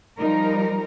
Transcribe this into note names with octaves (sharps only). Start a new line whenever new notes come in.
F3 G3 D#4 A#4